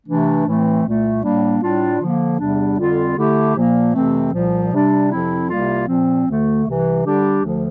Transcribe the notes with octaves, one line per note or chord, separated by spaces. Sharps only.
C3 E3 A3 D4
A2 E3 A3 C4
C2 A#2 A3
A2 G3 A#3 D4
A2 G3 D4 F4
D3 F3 A#3
E2 C3 G3 D4
F2 D3 G3 C4 F4
D3 A3 E4 G4
A#2 F3 A#3
F2 C3 E3 A3 C4
C2 A#2 F3
C3 G3 D4
F2 C3 F3 C4 E4
C2 C3 G3 A#3 F4
A#2 F3 C4
D2 D3 A3
C2 C3 E3
D3 G3 D4 G4
D2 D3 F3